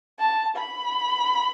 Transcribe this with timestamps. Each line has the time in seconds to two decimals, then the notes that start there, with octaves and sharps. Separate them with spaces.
0.19 A5
0.56 B5